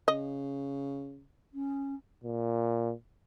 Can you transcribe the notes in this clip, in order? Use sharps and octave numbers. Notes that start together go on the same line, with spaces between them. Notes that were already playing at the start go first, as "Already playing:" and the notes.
C#3 D#5
C#4
A#2